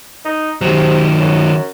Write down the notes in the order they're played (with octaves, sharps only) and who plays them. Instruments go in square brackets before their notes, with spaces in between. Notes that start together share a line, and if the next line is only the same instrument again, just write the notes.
[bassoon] D#4
[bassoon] C3 [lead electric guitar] D#3 F#3
[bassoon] F#2